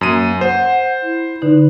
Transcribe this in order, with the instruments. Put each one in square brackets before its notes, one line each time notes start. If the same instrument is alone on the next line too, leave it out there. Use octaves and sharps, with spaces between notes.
[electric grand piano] F#2 D#7 [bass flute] A#3
[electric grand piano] C5 [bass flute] F#5
[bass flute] E4
[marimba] D3 D#4 [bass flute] B4